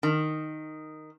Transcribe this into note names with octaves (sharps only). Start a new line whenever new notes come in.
D#3